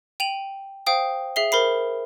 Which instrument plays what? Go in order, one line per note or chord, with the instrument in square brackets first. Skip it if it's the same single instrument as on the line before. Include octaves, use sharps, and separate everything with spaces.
[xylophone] G5 D#7 F7 F#7
C5 F5 G5 D#6
G#4 E5 C7 G7
A#4 C5 B5 C7